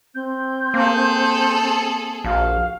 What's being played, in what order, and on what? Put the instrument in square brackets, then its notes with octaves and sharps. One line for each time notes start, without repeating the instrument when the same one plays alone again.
[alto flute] C4 [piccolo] G6
[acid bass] A#3 [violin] G#4 A4
[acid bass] A#1 [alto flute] F#4 [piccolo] F5